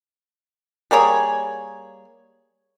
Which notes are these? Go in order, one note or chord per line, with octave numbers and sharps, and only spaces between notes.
G3 A#3 G#4 C#5